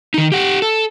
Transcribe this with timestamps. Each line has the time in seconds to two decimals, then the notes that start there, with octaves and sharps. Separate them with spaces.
0.14 D#3 D#4
0.32 G4 F#5
0.62 A4